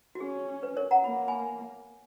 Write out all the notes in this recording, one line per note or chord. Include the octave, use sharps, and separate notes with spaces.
F#4
C#4 G#4
B4
A#4 C#5
F#5 A#5
A#3 B5
G#5 B5